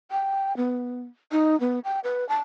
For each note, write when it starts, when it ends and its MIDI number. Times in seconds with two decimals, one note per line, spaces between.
0.11 0.56 79
0.57 1.03 59
1.32 1.59 63
1.60 1.80 59
1.84 2.00 79
2.04 2.27 71
2.29 2.39 81